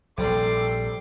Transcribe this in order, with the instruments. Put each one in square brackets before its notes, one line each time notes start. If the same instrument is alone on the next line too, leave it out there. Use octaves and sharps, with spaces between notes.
[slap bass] A#1 F#3 [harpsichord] C3 G3 [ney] A4 [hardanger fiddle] C6 D6